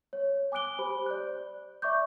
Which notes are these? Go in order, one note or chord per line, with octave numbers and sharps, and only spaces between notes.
C#5
G#5 D6 D#6 F#6 D7 G7
G4 C5 B5
D5 F#6
D5 E5 C#6 D6 G6